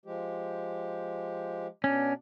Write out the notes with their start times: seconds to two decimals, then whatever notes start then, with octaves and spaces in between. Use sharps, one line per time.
0.06 F3 G#3 G4
1.84 B2 C#4 D4 D5